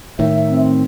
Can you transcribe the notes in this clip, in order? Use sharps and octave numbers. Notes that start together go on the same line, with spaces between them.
A2 D#3 E5
C4